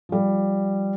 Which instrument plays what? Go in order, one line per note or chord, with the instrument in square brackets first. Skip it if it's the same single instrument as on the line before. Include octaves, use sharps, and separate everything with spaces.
[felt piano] F3 G3